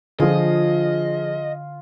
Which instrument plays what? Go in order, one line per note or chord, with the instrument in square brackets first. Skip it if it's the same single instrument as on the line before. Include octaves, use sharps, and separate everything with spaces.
[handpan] D3 [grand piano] F3 G#4 [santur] F4 [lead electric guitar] D#5